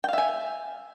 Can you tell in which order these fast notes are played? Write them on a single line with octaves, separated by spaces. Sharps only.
G5 F5 E5 G#5